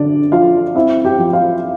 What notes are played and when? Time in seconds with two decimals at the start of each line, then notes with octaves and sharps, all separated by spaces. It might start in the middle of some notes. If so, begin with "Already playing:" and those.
Already playing: D3 D4 D5
0.32 F3 F4 F5
0.75 C4 E4 E5
1.05 G4 G5
1.18 F3
1.33 F4 F5